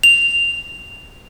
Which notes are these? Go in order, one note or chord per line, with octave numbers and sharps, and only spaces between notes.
F7